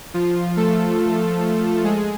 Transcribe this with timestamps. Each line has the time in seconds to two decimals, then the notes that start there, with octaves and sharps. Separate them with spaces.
0.14 F3 F4
0.57 A3 A4
1.84 G#3 G#4